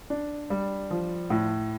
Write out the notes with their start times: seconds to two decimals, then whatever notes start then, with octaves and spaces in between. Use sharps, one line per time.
0.10 D4
0.50 G3
0.90 F3
1.30 A2